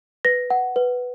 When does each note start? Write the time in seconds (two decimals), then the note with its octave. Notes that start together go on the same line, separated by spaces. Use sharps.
0.25 B4 A#6
0.50 F#5
0.76 B4